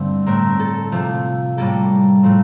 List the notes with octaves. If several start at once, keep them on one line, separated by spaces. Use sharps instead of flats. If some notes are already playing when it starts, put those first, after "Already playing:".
Already playing: G2 D3 A3 C4
A2 A3 C4 A#4
A4
C3 F3 A3
A2 G3 A#3 A4
A2 F3 A3 C4